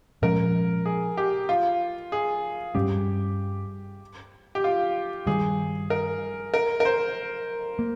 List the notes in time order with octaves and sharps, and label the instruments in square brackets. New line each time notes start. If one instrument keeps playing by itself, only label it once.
[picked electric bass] A#2 F3 G#3 C#4 [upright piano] A#4
[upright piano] G#4
G4
F4
G#4
[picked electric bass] G2 G3 C#4 [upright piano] G4
[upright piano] G4
F4
[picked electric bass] G2 D#3 G3 [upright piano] G#4
[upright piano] A#4
A#4
A#4
C5
[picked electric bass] A#3